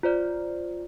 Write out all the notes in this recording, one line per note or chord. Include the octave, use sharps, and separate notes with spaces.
F4 C5 D5